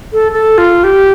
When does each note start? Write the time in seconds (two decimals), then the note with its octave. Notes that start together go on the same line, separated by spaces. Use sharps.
0.13 A4
0.32 A4
0.58 F4
0.84 G4